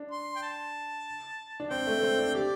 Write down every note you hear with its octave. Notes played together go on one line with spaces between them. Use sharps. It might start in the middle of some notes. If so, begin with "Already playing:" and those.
Already playing: D4
C6
G5
A5
D4
C4 G5
A3
A3
C4
D4
G4 D5